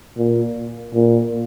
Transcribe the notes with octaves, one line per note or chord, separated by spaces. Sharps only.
A#2
A#2